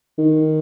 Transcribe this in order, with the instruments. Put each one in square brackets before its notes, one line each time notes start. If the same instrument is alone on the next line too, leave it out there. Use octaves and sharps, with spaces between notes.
[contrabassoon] D#3